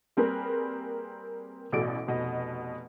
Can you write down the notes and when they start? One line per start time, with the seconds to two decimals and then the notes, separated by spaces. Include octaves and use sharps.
0.17 G3 A#3 C4 G#4 A#4 B4
1.72 A1 B2 A3 F#4 D5 D7
2.07 F1 B2 D#5